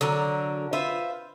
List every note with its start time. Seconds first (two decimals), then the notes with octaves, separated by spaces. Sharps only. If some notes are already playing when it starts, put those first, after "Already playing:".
0.01 D3 F#3 A#4
0.73 F4 B4 C5 E5